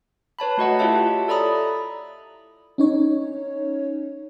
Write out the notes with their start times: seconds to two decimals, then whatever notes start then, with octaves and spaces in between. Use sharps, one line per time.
0.39 B4 C#5 A5 B5
0.57 A3 F#4 D#5 F#5
0.79 E4 F4 G4 C#5 E5 A5
1.28 A4 D5 A#5 B5 D#6
2.78 C#4 D#4 C#5